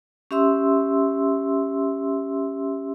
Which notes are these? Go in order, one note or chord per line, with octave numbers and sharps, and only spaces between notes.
C#4 G4 E5 C6 E6